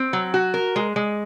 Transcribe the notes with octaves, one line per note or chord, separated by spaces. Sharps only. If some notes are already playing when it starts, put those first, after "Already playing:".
Already playing: C4
F#3
F#4
A#4
G#3
G#3